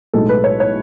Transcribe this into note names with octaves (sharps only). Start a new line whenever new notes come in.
B1 A2 G#3 A4
B4
C#5
C#5